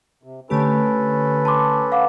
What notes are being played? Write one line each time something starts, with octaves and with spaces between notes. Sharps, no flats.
C3
D3 A3 C#4 G4 A4 B4
A5 C6 D6
F5 F#5 D6